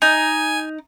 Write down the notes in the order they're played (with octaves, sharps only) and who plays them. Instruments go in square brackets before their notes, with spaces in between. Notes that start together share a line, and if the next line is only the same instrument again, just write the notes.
[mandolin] D#4 [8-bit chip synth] G#5